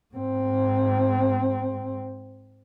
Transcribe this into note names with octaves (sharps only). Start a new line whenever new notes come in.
G#2 C4